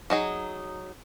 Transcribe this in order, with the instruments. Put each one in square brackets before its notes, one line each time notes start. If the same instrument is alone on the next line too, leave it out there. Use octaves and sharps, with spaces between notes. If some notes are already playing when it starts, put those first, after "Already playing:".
[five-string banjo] F#3 D#4 G#4